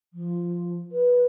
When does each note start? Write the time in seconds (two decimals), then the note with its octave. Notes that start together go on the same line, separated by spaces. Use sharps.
0.14 F3
0.92 B4